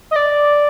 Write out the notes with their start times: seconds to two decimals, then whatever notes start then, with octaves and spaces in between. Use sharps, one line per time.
0.11 D#5
0.16 D5